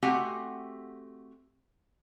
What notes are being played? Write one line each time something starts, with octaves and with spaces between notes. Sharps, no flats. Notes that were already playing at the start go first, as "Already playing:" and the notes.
A3 C4 F#4 G4 F#5 G#5